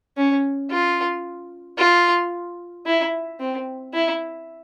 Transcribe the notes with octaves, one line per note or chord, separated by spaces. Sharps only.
C#4
F4
F4
E4
C4
E4